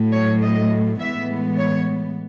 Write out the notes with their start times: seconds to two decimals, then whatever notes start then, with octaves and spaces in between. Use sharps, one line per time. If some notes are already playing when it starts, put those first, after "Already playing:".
Already playing: A2 F#3 A3
0.13 C#5
0.42 D#5
1.00 A2 E3 G#3 B3 E5
1.58 C#5